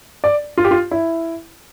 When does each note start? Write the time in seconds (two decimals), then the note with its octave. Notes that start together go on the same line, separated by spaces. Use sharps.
0.24 D5
0.58 F4
0.65 G4
0.71 F4
0.91 E4